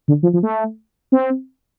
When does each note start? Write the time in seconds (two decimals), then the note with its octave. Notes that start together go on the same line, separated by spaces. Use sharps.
0.08 D3
0.23 F3
0.33 F3
0.43 A3
1.12 C4